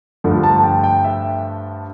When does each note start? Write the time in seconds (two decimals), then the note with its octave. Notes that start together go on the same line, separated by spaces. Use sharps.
0.24 G2 D3 F3 A3
0.43 A5
0.63 G5
0.84 G5
1.04 E5